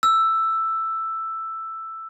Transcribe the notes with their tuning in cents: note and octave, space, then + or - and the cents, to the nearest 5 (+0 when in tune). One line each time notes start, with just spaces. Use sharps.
E6 +5